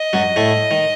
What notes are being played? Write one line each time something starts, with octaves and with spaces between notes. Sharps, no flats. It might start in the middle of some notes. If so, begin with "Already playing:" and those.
Already playing: D#5
F#2 F#3
A2 A3
D#3